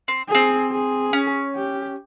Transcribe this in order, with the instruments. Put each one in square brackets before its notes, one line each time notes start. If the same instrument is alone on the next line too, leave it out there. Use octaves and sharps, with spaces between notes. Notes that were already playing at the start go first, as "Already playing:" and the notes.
[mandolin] C4
[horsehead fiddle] G#4
[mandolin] C4
[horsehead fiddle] G#4
[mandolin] C#4
[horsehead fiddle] G4